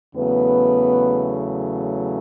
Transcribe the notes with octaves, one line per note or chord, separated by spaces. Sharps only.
E2 C#3 F#3 A3 B3 B4